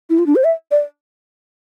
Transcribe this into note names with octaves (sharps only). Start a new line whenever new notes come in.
E4
F4
D4
C5
E5
D5